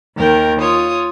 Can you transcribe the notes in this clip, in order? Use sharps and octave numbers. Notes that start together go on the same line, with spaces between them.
D#2 D#3 A#4 G5
F4 C#5 D#6